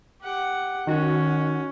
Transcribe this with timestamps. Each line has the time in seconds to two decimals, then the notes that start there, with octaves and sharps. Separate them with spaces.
0.21 G4 F#5
0.87 D#3 C#4 F#4